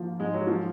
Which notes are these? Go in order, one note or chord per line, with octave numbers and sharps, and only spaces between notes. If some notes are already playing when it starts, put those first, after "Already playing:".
Already playing: G#2 F3 A#3
G#2 G#3
F#3
F3